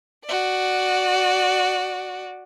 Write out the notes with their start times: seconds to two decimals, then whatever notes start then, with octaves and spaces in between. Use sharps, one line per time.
0.25 F#4 D5